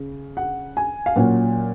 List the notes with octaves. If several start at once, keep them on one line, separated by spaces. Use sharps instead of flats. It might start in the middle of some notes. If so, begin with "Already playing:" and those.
Already playing: C#3
F#5
G#5
F5
A#2 F#3 A#3 C#4 F#5